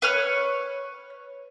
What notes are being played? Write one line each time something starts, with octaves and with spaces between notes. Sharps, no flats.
B4 C#5 F6